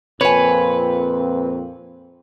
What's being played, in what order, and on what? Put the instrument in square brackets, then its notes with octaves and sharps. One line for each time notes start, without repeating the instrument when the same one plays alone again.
[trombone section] F2 A#2 C4 [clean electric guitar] B4 [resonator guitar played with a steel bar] C#5 G#5